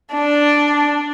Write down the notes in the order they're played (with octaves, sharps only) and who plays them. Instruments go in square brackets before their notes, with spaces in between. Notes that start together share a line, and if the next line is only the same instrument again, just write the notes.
[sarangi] D4